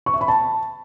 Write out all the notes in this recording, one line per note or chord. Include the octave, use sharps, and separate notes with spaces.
C#6
E5
B5
A5